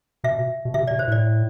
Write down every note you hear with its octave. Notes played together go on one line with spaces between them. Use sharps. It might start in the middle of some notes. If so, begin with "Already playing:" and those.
B2 E5
B2
C3 E5
B2 D5
C5
A2 D5